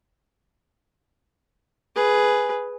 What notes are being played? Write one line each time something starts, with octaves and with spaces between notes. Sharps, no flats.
G#4 B4